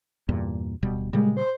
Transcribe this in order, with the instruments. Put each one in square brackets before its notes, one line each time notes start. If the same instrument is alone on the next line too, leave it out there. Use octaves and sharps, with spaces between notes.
[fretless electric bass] E2 G2 A#2
D1 B2 G3
[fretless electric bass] A#2 C#3 G3 [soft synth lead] G#3
[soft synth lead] C5